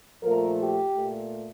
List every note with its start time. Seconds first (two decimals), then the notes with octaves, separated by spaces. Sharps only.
0.22 A#2 F3 A3 A#4
0.59 G4
0.95 A#2 A3